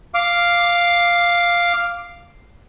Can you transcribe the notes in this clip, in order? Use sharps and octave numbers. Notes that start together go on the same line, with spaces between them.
F5 D6